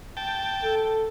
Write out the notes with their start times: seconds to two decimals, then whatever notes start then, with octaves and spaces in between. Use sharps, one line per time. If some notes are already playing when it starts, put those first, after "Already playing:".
0.17 G5 A5
0.64 A4